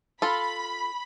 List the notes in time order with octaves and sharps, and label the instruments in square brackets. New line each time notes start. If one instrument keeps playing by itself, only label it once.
[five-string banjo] F4 A4 [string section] B5